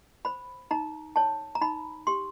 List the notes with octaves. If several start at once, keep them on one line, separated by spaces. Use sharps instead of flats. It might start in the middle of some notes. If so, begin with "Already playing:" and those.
C5 B5
D#4 A#5
C#5 A5
A#5
D#4 B5
G4 C6